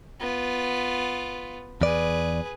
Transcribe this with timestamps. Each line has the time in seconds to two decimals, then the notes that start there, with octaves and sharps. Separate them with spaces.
0.20 B3 F4
1.81 E2 G#4 B4 D5